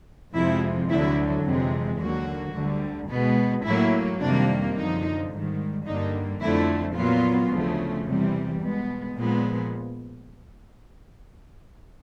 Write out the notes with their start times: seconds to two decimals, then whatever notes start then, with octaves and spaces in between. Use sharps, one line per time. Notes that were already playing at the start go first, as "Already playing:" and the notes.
0.34 F2 C3 F3 G#3 E4
0.90 D2 D3 F#3 E4
1.45 F2 C3 E3 G#3
2.00 D#2 D3 F#3 A#3 F#4
2.55 D2 D3 G3
3.10 B2 G#3 B3
3.65 A2 F#3 A#3 E4
4.20 F2 C3 D#3 G3 A#3 D4
4.75 F#2 D3 F3 D#4
5.31 G#2 D#3 G3
5.86 G2 D3 G3 A#3 D#4
6.40 F2 D3 F3 A3 E4
6.96 A#2 F#3 B3 F4
7.51 D2 C#3 F3 A3
8.06 E2 C3 E3 G3
8.61 B2 G#3 B3
9.16 A#2 F3 G#3 B3